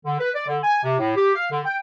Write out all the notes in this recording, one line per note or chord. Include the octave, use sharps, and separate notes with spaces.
D3
B4
D5
D3
G#5
C3
A2
G4
F5
D3
G5